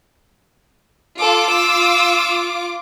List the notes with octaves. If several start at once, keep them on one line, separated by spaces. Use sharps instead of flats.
F4 A4 D6
E6